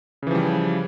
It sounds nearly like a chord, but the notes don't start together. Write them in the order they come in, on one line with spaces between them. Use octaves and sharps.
C#3 E3 F3 G3